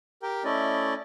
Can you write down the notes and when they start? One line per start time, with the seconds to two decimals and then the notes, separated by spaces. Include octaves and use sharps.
0.22 G4 A#4 G5
0.44 A3 C#4 E4 D5 D#5